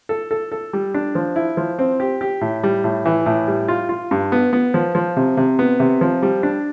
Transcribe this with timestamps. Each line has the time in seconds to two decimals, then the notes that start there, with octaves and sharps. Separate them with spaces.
0.09 A4
0.31 A4
0.52 A4
0.73 G3
0.94 D4
1.15 F3
1.36 E4
1.57 F3
1.79 C4
2.00 G4
2.21 G4
2.41 A2
2.63 G3
2.84 A2
3.05 E3
3.26 A2
3.47 G3
3.68 F4
3.89 F4
4.11 G2
4.32 B3
4.53 B3
4.74 F3
4.95 F3
5.17 C3
5.37 C3
5.59 B3
5.80 C3
6.01 F3
6.22 G3
6.43 D4